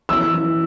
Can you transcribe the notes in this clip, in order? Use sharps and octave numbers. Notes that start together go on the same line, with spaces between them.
E3 E6
E3